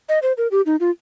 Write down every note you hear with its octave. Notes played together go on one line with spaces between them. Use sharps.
D#5
C5
A#4
G4
D#4
F4